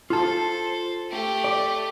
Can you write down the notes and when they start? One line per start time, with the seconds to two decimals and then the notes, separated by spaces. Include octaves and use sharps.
0.10 F4 A4 C5 A5
1.10 A3 G4
1.44 D5